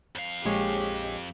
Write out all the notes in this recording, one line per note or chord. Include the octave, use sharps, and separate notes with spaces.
F2 F5
A#1 G#3 G4 C#5